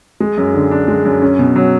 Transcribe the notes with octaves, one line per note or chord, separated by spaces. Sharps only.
G#3
F#2
D3
D4
G#3
F#2
C#4
B2
F#3